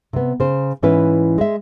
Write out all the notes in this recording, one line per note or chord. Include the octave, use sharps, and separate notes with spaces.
C3 B3
C#3 C5
G#2 E3 C#4 E4 B4
G#3 E5